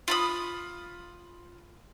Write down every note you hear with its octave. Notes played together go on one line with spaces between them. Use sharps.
F4 B5 D#6